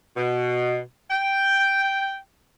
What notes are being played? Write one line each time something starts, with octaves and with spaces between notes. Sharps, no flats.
B2
G5